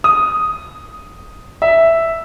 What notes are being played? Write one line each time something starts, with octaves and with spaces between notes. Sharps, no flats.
D#6
E5